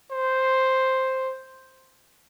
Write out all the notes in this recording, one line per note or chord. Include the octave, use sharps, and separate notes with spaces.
C5